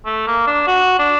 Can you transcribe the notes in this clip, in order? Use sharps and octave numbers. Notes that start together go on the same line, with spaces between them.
A3
A#3
D4
F#4
D4